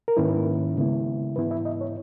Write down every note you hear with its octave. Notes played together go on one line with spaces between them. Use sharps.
A#4
G#2 D#3 A#3 C#4 E4 B4
C#3 G#3 B3 E4
G#2 E3 B3 E4 B4
E5
D#5
C#5